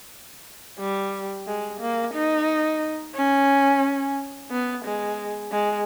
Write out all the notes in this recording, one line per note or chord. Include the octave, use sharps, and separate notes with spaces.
G3
G#3
A#3
D#4
C#4
B3
G#3
G#3